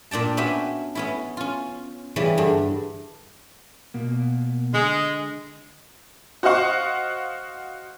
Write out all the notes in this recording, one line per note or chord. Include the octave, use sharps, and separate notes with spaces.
A#2 D4 G5 A5
B3 C#4 F#4 E5 G5 G#5
B3 C#4 E4
C#4 F4
C#3 E3 G3 C#4
G2 D3
B2 A#3
D3 G#3
F#4 C5 D#5 F5 F#5 C#6